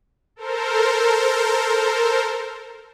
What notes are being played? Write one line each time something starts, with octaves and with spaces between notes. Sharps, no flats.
A4 A#4 C5